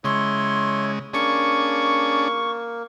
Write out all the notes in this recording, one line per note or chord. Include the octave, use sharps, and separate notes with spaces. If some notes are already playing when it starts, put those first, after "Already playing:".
C#3 G#3 E4 C#5 C6
A#3 C#4 D4 G#4 C#6